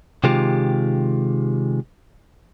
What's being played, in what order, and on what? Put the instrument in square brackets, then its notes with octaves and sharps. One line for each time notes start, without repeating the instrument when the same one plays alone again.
[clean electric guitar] C3 D#3 G#3 F4 G4